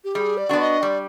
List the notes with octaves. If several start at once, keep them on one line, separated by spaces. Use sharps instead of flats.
G4
G3 G#4
D5
B3 D4 F#4
D#5
G3 D5